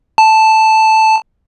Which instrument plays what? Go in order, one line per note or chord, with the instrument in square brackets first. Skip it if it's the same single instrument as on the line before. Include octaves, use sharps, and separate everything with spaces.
[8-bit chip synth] A5